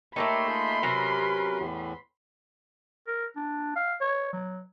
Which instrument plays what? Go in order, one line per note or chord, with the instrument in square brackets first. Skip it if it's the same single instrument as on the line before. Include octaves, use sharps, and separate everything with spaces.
[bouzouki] A3 A#3 D#4 [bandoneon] G4 A4 C#5 [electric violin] B5 C6
[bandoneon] F4 G#4 G6
[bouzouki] C3 F#3 A#5 [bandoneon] C#4 A#4 B4
[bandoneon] E2 A2 E3
[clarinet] A#4
D4
F5
C#5
F#3